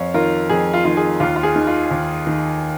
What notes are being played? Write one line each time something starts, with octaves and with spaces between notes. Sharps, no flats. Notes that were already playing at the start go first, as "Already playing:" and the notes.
Already playing: F2 C#5 F5
D#3 F4 A#4
F2 G#4
F4
D#3 F4
G#4
D#2 F4
F4
G#4
D#3
F4
D#2
D#3